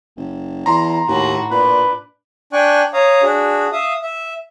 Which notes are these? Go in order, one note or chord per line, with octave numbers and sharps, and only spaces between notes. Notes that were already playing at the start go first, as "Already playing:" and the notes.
F#1
E2 A#5 C6
D#2 A2 F#4
A#2 D4 B4
D4 D5 G5 G#5 C#6 F#6
C#5 F5 A#5 D#6
D4 F#4 G#4
E5 F5 D#6
E5